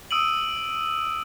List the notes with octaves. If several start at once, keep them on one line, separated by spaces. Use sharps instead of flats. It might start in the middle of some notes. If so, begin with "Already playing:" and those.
D#6 E6 D7 D#7 F#7